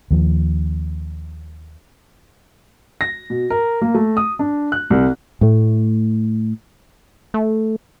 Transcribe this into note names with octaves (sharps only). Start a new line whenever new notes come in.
D#2 F3
A#6
B2
A#4
A#3
A3
D#6
D4
F#6
C2
A2 A3
A3